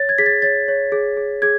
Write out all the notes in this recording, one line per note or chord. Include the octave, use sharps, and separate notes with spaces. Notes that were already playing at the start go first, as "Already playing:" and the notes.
Already playing: C#5 A6
G#6
G#4 B6
A6
C#5 A6
C#5
G#4
G#4
G#4 G#6